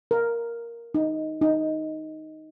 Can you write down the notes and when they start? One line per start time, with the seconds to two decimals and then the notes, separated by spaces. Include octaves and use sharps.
0.11 A#4
0.94 D#4
1.42 D#4